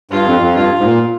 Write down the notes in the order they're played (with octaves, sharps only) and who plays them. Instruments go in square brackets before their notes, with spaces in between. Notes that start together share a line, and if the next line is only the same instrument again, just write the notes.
[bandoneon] G2 [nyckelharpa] F4
[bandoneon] F2
F2
[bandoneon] G2 [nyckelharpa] F4
[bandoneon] G#2
A#2